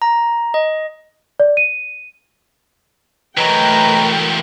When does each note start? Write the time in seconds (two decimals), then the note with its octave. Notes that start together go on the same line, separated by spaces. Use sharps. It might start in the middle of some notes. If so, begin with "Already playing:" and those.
0.02 A#5
0.54 D#5
1.40 D5
1.57 D#7
3.37 E3 F#3 A3 A#4 B4 D#5 G5 A#5